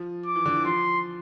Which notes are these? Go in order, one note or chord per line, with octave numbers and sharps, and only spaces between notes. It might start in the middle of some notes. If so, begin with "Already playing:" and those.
Already playing: F3
D6
E3
D3
E3
F3 C6